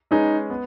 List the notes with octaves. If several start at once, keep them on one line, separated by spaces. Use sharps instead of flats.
G#3 C#4 D#4 G#4 B4 D#5
B3